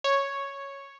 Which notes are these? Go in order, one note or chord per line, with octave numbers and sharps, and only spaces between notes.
C#5